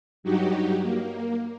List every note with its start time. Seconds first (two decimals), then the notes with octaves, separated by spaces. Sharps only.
0.23 G2 F#3 D#4 F#4 G4
0.82 A#3